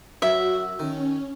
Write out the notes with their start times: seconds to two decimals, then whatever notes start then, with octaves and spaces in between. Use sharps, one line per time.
0.22 F#2 F#4 E5
0.79 D#3 C#4